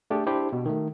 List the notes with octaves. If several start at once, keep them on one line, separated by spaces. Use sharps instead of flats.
A3 D4 G4 G#4
D4 E4 G4 C5
B2
D#3 A3